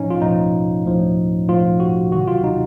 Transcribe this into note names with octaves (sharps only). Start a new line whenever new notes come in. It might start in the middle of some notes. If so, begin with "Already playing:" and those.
Already playing: A2 F3 C#4 D#4
F4
A2 F3 D#4
A2 F3
A2 F3 F4
F#4
C3 D#3 F#3 F#4
F4
D#4